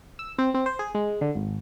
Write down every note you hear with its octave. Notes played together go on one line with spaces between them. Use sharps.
E6
C4
C4
C5
G#4
G#3
D3
G#1